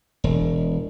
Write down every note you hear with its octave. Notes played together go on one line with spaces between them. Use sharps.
E1